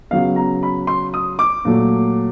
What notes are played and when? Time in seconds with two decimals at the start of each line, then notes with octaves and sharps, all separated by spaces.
0.11 C#3 F#3 B3 F5
0.36 A#5
0.63 B5
0.87 C6
1.14 D#6
1.39 D6
1.65 A#2 F#3 A3